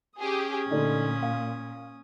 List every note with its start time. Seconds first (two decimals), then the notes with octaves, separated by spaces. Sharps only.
0.19 C#4 G4 G#4 D#6
0.70 A#2 D3 A3 D#4
1.23 F5